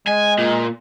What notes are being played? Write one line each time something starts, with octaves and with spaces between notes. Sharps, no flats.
G#3 G#5
A#2